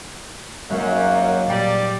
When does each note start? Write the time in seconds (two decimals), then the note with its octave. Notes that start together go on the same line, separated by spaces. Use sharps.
0.70 G#1 F#2 F#3 G#3 A#3 C#5
1.48 A#2 G3 D5